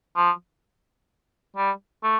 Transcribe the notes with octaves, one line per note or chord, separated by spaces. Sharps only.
F3
G3
A3